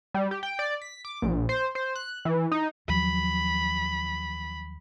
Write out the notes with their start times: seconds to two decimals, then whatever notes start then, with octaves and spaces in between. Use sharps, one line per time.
0.14 G3
0.31 G4
0.43 G5
0.59 D5
0.82 B6
1.05 D6
1.22 A#1
1.49 C5
1.75 C5
1.96 F#6
2.25 E3
2.52 D#4
2.88 D#2 F3 F#3 B5